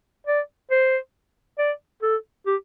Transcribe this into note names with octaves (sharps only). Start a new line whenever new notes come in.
D5
C5
D5
A4
G4